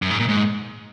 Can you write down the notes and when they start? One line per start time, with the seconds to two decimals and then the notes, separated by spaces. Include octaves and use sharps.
0.02 F#2
0.11 G#2
0.20 A#2
0.28 G#2